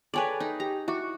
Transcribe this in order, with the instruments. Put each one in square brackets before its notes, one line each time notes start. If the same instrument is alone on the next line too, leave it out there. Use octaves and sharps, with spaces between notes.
[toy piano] G#4 G5 G#5 [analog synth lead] A4 [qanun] B4 C#5 D5
[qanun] D#4
[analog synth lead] G4 [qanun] A#5
[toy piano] E4 E5 D6 [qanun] F#4 [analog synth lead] C#6